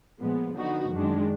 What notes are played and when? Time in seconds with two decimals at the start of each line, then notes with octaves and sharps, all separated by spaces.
0.20 A#2 F3 G#3 B3
0.56 D3 F3 B3 D#4 F#4
0.92 F#2 D#3 G#3 D4